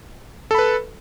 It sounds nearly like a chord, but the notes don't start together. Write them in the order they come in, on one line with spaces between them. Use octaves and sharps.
A4 B5 B4